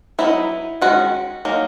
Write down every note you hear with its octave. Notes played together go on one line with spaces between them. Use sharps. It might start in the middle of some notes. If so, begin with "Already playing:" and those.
F#3 B3 D#4 E4
D#3 G#3 C#4 F#4
F#3 A#3 D#4